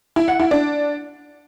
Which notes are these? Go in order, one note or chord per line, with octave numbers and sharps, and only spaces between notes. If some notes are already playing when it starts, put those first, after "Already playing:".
E4
F#5
E4
D4